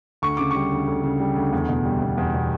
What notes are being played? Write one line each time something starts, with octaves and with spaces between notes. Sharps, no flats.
D2 C#6
C#3 D6
G3 C#6
D2
D2
C#3
G3
D2
E2
B2
G3
E2
E2
B2